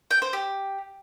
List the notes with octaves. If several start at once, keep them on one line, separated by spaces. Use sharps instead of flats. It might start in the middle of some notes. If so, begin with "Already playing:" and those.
G5
C5
G4